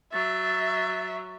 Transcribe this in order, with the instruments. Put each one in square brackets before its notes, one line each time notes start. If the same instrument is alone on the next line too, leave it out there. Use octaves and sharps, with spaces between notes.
[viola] F#3 [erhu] E5 [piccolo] A6